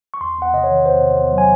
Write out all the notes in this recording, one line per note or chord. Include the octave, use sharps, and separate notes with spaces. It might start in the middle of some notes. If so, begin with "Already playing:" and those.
C#6
E2 C6
E2 F#5
C3 D#5
C#5
D#3
E2 C5
C3
E2
F#3
G#5